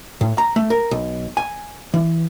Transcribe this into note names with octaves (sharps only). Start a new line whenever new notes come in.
A2
A#5
A3
A#4
B1
G#5
E3